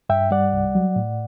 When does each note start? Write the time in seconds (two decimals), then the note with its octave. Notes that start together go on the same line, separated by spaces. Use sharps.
0.09 G2 E5 G5
0.31 G3 D5 F#5
0.53 C2
0.75 F#3
0.96 A2